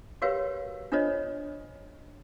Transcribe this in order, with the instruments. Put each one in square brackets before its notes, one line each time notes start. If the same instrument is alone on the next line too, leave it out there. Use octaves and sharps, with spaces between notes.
[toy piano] F#4 G4 A#4 B4 C#5 F5
D4 F4 A4 C5 C#5 D#5